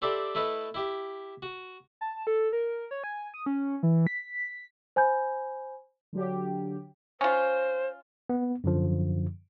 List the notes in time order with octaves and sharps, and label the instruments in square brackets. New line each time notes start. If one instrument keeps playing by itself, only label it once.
[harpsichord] C4 G4 A4 D5 E5 B5
A3 E4 A4 B4 D#5
E4 G4 E5
F#4
[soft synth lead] A5
A4
A#4
C#5
G#5
D#6
C#4
E3
B6
[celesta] C5 G#5 B5 G6
[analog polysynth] D3 F#3 G4
[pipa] C#4 F4 [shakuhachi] C5
[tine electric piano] B3
F#2 D3 F3